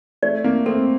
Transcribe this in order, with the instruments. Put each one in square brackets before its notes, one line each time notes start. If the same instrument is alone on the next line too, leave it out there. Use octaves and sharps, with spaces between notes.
[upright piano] A3 [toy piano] D5
[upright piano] A#3
[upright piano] A3 C4 [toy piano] A4